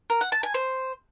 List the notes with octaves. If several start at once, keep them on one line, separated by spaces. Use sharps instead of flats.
A#4
F#5
A5
G#5
C5